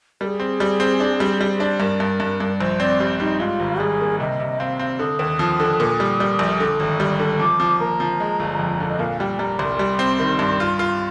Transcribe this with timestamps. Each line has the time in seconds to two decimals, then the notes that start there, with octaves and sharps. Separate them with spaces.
0.21 G3 G#4 A#4
0.40 C4
0.60 G3
0.80 C4
1.00 D4
1.20 G3
1.41 G3
1.60 D4
1.80 G2 A#4
2.00 G2
2.20 G2
2.40 G2
2.60 A#1 C5
2.80 C4 D5
3.00 G3
3.20 G3 D#4
3.40 G#2 F4
3.60 G#1
3.80 G3 G#4
4.00 A#3
4.20 C3 D#5
4.40 C3
4.59 C4 F5
4.79 C4
4.99 D3 D#6
5.19 D#2
5.39 F3
5.60 D3
5.80 A#2
6.00 G3
6.20 G3
6.39 A#1
6.60 D3
6.80 G#1
7.00 G3
7.19 D3
7.39 F3 D6
7.60 F3
7.80 A#3 A#5
8.00 F3
8.20 G#3
8.40 G1
8.59 F2
8.80 D3
8.88 D#5
8.99 A#2 F5
9.20 G3 G5
9.39 G3 A#5
9.59 C2 C6
9.79 G3
9.99 C4
10.19 D#3
10.39 G2
10.60 F4
10.79 F4